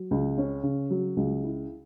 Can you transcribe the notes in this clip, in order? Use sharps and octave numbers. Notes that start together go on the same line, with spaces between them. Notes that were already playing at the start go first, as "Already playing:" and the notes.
Already playing: F#3
C#2
C#4
C#3
F#3
C#2
E4